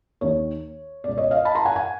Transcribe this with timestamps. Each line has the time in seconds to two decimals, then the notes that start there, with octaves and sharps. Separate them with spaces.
0.21 D#2 D#3 C#5
1.04 C#2 B2 D5
1.18 C#5 D#5
1.31 D#5 F5
1.45 A5 B5
1.55 A#5 C6
1.65 F#5 G#5
1.76 F#5 G#5